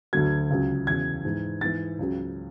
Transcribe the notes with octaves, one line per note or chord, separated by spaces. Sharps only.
D2 D3 F#3 G#6
C#2 C#3 F#3
E2 C#3 F#3 G#6
G#2 E3
G#2 E3 A6
C#2 C#3 F#3